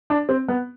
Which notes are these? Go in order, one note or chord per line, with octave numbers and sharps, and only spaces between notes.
D4
C4
B3